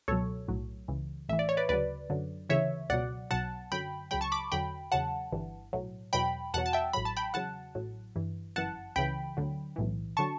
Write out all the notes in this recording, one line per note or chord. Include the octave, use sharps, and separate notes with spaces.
C#2 B2 F#3 A4 C#5
B1 A2 F#3
C#2 C#3 E3
A1 A2 E3 E5
D5
C#5
B4 D5
D2 C#3 F#3 B4 D5
F#2 D3 F#3
D2 C#3 E3 C#5 E5
C#2 B2 F#3 D5 F#5
B1 B2 F#3 F#5 A5
F#2 D3 F#3 G5 B5
C#2 C#3 F#3 G5 B5
A5 C#6
B5 D6
E2 D3 F#3 G5 B5
E2 C#3 F#3 F#5 A5
G1 G2 E3
B1 A2 F#3
E2 B2 F#3 G5 B5
E2 B2 F#3 F#5 A5
A5
E5 G5
A1 A2 F#3 B5
A5
G5 B5
E2 C#3 F#3 F#5 A5
A1 A2 F#3
G1 G2 E3
G1 F#2 E3 F#5 A5
C#2 C#3 E3 G5 B5
D2 D3 F#3
B1 A2 E3
D3 F#3 A5 C#6